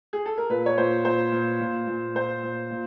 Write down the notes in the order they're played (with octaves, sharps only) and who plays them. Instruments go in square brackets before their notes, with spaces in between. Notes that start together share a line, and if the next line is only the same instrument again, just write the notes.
[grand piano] G#4
A4
A#4
A#2 B4
C#5
A#2 C5
A#2 C5
A#2
A#2
A#2
A#2 C5
A#2
A#2